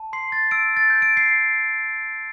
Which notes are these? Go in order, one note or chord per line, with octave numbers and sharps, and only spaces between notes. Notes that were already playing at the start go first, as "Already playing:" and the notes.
Already playing: A5
C6 C7
A6
E6 D7
A6
G6
D7
C7